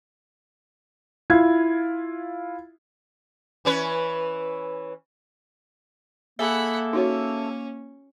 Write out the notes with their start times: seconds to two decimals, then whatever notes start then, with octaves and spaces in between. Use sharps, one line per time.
1.30 E4 F4 G#6
3.65 E3 C#4 B4
6.39 A#3 G#4 A4 E5 F#5 B5
6.93 C#4 D#4 F#4 C#5